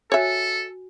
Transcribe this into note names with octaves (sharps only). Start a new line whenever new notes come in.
F#4 A4 C#5 E5 G#5